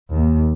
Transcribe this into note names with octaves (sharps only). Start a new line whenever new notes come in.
D#2